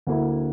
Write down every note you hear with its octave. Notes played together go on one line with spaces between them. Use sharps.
D2 D3 A#3 E4